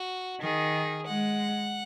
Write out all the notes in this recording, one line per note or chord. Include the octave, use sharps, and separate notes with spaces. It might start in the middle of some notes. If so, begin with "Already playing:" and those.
Already playing: F#4
D#3 G#4
G#3 F#5